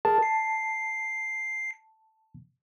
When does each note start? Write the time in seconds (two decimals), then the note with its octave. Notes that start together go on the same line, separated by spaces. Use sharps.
0.05 G#4 A#4 A5
0.23 C7